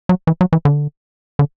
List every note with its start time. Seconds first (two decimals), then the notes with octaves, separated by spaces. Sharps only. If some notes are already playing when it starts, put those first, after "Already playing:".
0.09 F#3
0.27 E3
0.41 F#3
0.53 E3
0.65 D3
1.39 D3